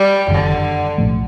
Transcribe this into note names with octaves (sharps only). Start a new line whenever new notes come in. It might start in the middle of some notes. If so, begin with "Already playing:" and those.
Already playing: G3
F#1 F#2 D3 D#3 G3
B1 A2 F3 A3